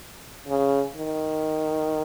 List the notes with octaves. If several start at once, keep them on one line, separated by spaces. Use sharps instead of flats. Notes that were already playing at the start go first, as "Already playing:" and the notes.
C#3
D#3